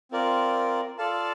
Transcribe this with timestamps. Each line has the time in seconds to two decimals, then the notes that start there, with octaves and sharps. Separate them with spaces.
0.11 C4 F4 A#4 D5
0.98 F4 A4 D5 F5 A5